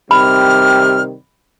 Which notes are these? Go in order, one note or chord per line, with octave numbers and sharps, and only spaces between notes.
C3 D#3 G3 B5 F6